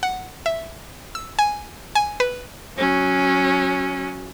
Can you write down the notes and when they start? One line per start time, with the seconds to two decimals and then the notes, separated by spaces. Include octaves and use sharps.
0.03 F#5
0.46 E5
1.15 E6
1.39 G#5
1.95 G#5
2.20 B4
2.77 F#3 C#4